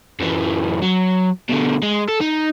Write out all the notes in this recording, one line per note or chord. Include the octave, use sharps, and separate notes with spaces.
F#2 E3
F#3
B2 D3
G#3
A4
D#4